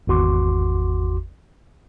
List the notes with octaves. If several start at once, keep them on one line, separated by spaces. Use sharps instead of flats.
G#1 E2 F#4 C6 D6